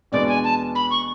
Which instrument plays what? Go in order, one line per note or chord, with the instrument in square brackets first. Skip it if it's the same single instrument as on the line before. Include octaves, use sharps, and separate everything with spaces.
[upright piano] E2 B2 G#3 B3 D4 [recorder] D5
[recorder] G#5
A5
B5
C#6